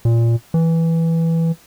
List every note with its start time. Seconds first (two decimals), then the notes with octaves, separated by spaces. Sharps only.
0.05 A#2
0.54 E3